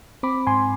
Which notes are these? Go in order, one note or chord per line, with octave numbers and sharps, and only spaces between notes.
C4 B5 D6
G#2 G#5 C6